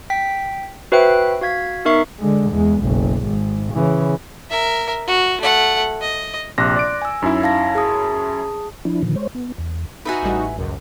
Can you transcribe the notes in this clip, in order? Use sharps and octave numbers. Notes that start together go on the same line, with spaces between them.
G5 B6
F#4 B4 C5 E5 G5 F#6
F#4 F5 G#6 B6
B3 D#4 A#4 E5 C#6 C7
D3 G#3
E2 G#3
F#1 B1
G#1 G#2
C#3 E3
A#4 E5
F#4
A3 F#5
D#5
A#1 C3 C6 D6 F#6 A#6
D5 D7
G#5 E6
F#2 C#4 D#4 E4
F5 A5 A#6
G#4 A5 D#6
F3 D4 E4
A#2 D3 D#3 F3
G#3 C5 C#5
B3
E2
D#4 F#4 B4 E5 G#5
A1 A2 G3
C#2 F#2